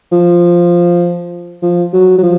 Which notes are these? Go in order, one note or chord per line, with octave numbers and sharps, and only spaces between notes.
F3
F3
F#3
F#3
F3